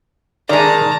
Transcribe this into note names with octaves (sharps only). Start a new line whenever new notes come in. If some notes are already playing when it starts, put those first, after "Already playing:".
D#3 G#3 D5 A5 A#5